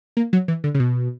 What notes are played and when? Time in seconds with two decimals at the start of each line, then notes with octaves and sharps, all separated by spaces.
0.17 A#3
0.33 F#3
0.48 E3
0.64 D3
0.75 C#3
0.80 B2